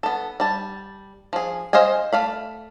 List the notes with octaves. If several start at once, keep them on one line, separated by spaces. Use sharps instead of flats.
B3 A4
G3 A5
F3 G#4
C5 D#5 F5 G5 G#5
A3 F5 B5